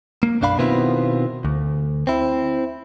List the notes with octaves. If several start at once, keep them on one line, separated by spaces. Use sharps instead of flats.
A#3
B1 F#2 D4 F5 B5
B2 D#3 B3 C4 E4 F4
D2
C4 E4